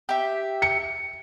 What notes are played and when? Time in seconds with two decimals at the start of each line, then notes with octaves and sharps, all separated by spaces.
0.09 G4 E5
0.62 C#7